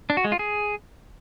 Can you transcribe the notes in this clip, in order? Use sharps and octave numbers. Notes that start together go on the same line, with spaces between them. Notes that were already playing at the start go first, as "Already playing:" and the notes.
D4
F#4
G#3
F4
G#4